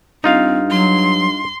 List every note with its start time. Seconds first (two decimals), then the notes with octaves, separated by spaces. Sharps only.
0.24 G2 C4 D#4 F4 F5
0.71 F#3 C6